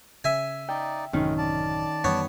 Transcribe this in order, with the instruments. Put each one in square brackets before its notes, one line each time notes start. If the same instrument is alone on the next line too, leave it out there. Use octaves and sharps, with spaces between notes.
[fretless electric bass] C#3 [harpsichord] E5 G#5
[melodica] D#4 D5 [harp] G5
[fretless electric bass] A1 F#2 C3 [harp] D#3 C#4 D#4 [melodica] G#3 A3
[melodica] D5 A5
[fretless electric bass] F#2 E3 G3 [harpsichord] B3 C#5